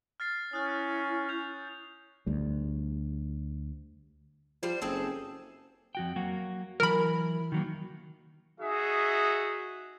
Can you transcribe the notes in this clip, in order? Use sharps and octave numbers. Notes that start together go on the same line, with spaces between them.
F6 A6 C7
C#4 E4 D#6 F6 F#6
G6 F7
D2 G3
F3 G3 C5
F#1 C4 G#4 A4
F2 F#4 G5
F#3 A#3 F#4
E3 F#3 A#4 B5
D#3 F#3 A#3
D#4 F#4 G#4 E5